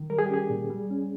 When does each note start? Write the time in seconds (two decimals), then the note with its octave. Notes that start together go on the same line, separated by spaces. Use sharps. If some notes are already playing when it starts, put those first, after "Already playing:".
Already playing: D#3
0.10 G3 A#4
0.19 G#4
0.26 G4
0.30 C#4 G#4
0.50 A#2
0.70 G3
0.90 C#4